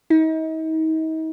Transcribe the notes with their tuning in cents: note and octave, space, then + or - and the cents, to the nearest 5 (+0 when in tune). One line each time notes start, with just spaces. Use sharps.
D#4 +40